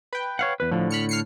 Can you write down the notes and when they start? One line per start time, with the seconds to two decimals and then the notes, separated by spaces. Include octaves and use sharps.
0.13 B4 G5
0.39 C#5 F5 F#5
0.60 E2 B4
0.71 A2 D3 F3
0.91 B5 F6 C#7
1.09 F6 C7 C#7